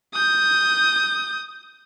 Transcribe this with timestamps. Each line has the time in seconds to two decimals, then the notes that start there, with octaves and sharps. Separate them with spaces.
0.14 D#6 G6